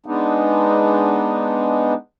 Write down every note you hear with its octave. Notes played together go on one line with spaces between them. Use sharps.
G#3 B3 D4 D#4